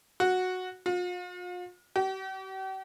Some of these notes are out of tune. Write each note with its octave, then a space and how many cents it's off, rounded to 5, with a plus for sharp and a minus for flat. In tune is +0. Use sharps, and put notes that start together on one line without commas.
F#4 -10
F4 +40
G4 -45